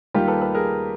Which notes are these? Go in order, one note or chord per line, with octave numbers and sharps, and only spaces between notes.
D#2 D#3 G3 F4 G4
A4 B4
A4 B4
G#4 A#4